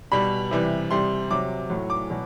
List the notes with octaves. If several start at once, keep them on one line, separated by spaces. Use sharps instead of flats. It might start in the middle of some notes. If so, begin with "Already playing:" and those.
B2 G3 B5
C3 E3 G3
C3 G3 C6
C3 F#3 D6
A2 F#3
D6
B2 F#3